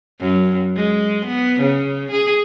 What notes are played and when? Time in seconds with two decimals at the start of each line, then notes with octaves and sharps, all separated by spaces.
0.20 F#2
0.76 G#3
1.25 B3
1.61 C#3
2.12 G#4